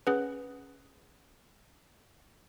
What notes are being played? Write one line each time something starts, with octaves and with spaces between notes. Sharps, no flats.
C#4 G#4 B4 F#5